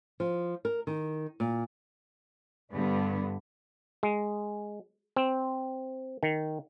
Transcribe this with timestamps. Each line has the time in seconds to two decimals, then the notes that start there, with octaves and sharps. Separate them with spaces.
0.20 F3
0.65 A#4
0.87 D#3
1.40 A#2
2.72 G2 D3 B3
4.03 G#3
5.17 C4
6.23 D#3